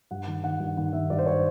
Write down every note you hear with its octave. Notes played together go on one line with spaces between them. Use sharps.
G2 F#5
D#3
D#3 F#5
G2
D#3 F#5
D#3 E5
G2 D5
C5
C#5